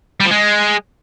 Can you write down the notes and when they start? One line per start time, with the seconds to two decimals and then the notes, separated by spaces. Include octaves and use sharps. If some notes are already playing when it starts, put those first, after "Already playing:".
0.20 G3
0.26 F3
0.31 G#3